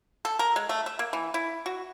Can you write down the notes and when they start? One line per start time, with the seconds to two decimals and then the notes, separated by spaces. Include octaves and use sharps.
0.25 A4
0.39 A#4
0.56 G#3
0.69 A3
0.86 E5
0.99 A#3
1.13 E3
1.34 E4
1.66 F#4